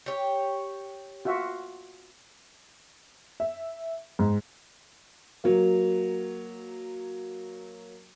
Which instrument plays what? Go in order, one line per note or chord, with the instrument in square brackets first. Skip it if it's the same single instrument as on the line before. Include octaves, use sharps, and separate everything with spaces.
[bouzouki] G4 C#5
[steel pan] F4 F#4 E5
[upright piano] E5
G#2
[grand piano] F#3 A#3